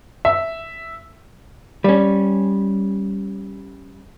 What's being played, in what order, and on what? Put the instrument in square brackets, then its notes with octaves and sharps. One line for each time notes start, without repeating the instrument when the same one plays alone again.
[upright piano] E5
[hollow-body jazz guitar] G3 C#4